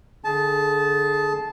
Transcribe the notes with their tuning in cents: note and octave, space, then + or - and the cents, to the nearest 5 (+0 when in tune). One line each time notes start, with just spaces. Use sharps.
D3 +0 G#4 +15 A5 -15